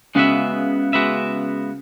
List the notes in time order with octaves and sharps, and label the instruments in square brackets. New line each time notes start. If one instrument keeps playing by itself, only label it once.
[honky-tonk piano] C#3 [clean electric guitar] G#3 B3 F#4 B4 E5
[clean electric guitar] G#3 B3 F#4 B4 E5